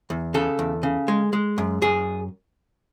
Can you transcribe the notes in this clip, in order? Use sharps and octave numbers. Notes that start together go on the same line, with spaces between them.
E2
C#3 A4
E2
C#3
G#3
G#3
F#2
F#2 G#4